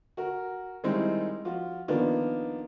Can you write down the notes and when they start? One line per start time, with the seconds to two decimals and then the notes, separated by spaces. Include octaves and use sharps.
0.17 F#4 A#4
0.84 D#3 G3 G#3 C4 D#4 E4
1.45 F3 F4 F#4
1.88 D#3 F3 A#3 B3 D4